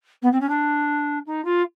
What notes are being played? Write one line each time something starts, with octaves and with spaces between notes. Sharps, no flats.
B3
C4
C#4
D4
D#4
F4